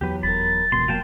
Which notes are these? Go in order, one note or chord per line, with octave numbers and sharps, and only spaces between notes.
E2 F#3 G4 B4
F1 A#4 B5 A6
E1 C2 B2 C6
B2 F#3 A#3 F4 G5 A5